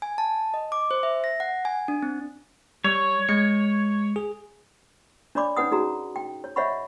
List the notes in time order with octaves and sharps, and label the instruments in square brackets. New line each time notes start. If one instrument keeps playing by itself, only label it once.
[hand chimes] G#5
A5
D#5
D6
C5
E5
A#6
F#5
G#5
D4
C4
[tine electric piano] G3 [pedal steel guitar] C#5
[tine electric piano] G#3 C#7
G#4
[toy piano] D4 C#5 D5 B5 D6
C#4 D#4 B4 F#5 D#6
D#4 F#4 G#4 A#5
G5
C#5
C#5 D#5 E5 F#5 B5 C#6